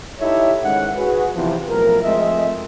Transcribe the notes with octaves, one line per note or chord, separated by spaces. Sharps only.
D#4 E4 G4 A4 C#5 E5
G#2 D#3 C#4 F#5
F#4 G#4 B4
E2 C3 F3
B1 A2 F3 A#4
F3 G#3 A3 C4 D#5 E5